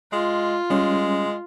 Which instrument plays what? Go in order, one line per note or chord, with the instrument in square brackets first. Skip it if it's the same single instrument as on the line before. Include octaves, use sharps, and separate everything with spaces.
[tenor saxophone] G#3 [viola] F4
[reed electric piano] G3 C#4 [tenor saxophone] G#3